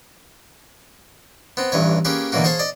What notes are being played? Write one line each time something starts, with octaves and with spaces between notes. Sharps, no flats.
B3 C4
A1 G2 E3 C#5
A#3 C#4 G4 G#4 B4
B2 D3 E3 F#3 A#3 F#4
G#4 C5 C#5 F5 A5
D5 D#5